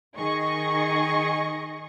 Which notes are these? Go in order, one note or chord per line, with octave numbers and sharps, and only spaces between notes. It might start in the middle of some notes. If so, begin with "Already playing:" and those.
D#3 G#4 D#5 C#6